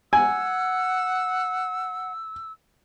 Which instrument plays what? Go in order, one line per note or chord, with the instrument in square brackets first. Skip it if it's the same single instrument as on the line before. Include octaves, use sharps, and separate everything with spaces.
[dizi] F#5 [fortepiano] G#5 [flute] E6